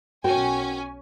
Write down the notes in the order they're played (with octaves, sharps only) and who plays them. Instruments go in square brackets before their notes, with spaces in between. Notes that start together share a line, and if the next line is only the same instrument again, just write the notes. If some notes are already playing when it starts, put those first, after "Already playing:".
[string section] B1 C#4 G#5 [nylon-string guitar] F#4 A#4 G5